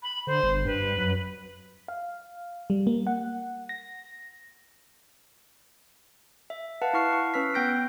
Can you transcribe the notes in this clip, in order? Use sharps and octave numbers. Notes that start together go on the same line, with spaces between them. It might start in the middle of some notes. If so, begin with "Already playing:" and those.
B5
D3 C5
G1
G2 B4
F#2
F5
G3
A#3
F#5
A#6
E5
B4 F5 F#5 A5
E4 F#5 C#6 F6 C7
C#6
C#4 B4 E6 F6 B6 C7
B3 G5 G6 A#6 D7